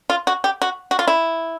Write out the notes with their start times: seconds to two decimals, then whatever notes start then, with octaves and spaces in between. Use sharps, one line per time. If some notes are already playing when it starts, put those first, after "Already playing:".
0.10 F4
0.27 F#4
0.44 G4
0.62 F#4
0.91 F#4
0.99 F4
1.08 E4